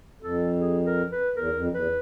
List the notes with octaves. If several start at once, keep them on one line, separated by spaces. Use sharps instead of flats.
F2 A4
G#4
A#4
B4
E2 A#4
F2
E2 B4